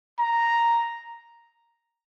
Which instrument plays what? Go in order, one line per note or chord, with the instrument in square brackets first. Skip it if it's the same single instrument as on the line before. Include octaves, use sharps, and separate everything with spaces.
[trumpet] A#5